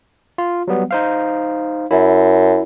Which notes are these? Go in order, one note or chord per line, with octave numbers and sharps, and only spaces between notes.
F4
F#3 G3 B3
D#4 C5 F5
F#2 E4